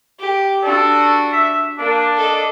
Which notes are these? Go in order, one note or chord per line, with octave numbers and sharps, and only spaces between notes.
G4
D4 F#4 A4
E5
A#3 D4
A4 D#5